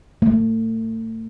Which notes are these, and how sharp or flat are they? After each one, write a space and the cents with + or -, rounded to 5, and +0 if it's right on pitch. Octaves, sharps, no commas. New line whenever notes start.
A3 +35